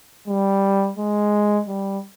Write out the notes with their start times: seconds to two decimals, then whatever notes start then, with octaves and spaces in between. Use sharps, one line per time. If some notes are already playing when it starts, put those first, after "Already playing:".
0.28 G3
0.98 G#3
1.68 G3